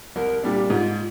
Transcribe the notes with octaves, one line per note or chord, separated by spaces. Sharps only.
C2 A#4
A#2 G3 D4 G4
G#2 F4